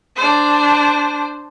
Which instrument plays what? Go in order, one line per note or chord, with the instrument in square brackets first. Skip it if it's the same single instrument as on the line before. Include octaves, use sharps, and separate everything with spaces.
[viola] D4 C5